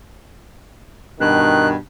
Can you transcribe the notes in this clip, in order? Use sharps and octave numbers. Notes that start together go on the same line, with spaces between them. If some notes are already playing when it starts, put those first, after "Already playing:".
G2 B2 D#3 F#6